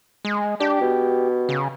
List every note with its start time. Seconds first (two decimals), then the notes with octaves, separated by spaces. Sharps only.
0.25 G#3
0.60 D4 G4
0.81 B2
1.49 C#3